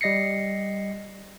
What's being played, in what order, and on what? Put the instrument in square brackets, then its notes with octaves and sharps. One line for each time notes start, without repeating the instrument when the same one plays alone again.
[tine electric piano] G3 D#5 A#6 C7 C#7